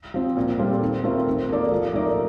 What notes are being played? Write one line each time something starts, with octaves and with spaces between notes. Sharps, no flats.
F3 C4
A#2
G3 C4 F4 A4
D#3
A3 C4 F4 A#4
D#3
A#3 D#4 A4 D5
F3
A3 D#4 A#4 D5